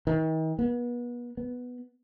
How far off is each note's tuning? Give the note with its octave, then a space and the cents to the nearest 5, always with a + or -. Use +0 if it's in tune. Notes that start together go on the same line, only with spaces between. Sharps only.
D#3 +40
B3 -35
B3 +0